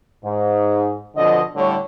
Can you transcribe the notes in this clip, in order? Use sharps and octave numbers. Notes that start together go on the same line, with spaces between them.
G#2
F2 B2 D3 F3 D#5
A2 D3 G3 C#5